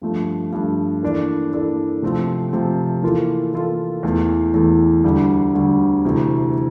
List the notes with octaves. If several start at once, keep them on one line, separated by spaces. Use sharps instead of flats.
G2 F3 A3
G2 F3 A3
E3 A#3 D4 A4
E3 A#3 D4 A4
C3 F3 A3 C4
C3 F3 A3 C4
E3 A#3 F4 A4
E3 A#3 F4 A4
E2 E3 A3
E2 E3 A3
D2 D3 G3
D2 D3 G3
D2 C3 E3 A3